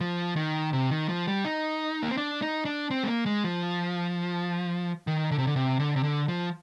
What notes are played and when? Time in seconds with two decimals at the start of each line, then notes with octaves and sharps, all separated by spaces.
0.01 F3
0.36 D#3
0.73 C3
0.91 D#3
1.09 F3
1.28 G3
1.45 D#4
2.03 A#3
2.10 C4
2.17 D4
2.42 D#4
2.65 D4
2.91 C4
3.03 G#3
3.08 A#3
3.26 G#3
3.44 F3
5.07 D#3
5.31 D3
5.38 C3
5.47 D3
5.56 C3
5.80 D3
5.96 C3
6.03 D3
6.28 F3